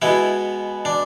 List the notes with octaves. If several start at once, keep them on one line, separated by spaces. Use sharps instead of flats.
B2 G#3 B3 E4
D4